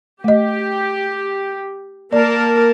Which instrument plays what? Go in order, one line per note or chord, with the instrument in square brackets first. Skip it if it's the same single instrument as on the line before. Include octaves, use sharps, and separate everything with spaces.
[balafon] A3 D#5 [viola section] G4
[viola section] A#3 A#4 A5 [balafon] D5